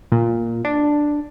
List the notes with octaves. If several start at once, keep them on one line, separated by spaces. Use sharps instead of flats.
A#2
D4